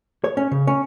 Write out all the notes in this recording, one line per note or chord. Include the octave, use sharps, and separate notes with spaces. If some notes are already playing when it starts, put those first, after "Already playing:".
C#5
C#4
C#3
C#4